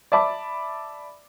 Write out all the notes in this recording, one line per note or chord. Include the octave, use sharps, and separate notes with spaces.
D5 E5 A5 B5 D6